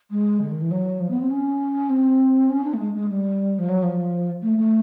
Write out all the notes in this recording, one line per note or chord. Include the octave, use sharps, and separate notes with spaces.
G#3
D3
D#3
E3
F#3
F3
B3
C4
C#4
C4
C#4
D4
A3
G#3
G#3
G3
F3
F#3
F3
A3
A3